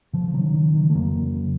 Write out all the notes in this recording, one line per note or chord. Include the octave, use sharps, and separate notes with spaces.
C#3 F3
F3
D#3 F#3
C#3
D#3
C#3
D#3 F#3
A3
F2 F#3 A#3
C#3